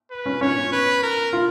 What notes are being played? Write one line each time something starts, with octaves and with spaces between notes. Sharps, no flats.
B4
C#4
C#4 C#5
B4
A#4
F4